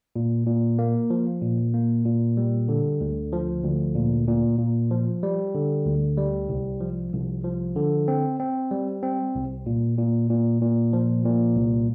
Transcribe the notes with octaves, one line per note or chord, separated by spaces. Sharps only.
A#2
A#2
A#3
F3
A#2
A#3
A#2
G3
D3
D2
F3
D2
A#2
A#2
A#2
F3
G3
D3
D2
G3
C2
F3
C2
F3
D3
C4
C4
G3
C4
C2
A#2
A#2
A#2
A#2
F3
A#2
C2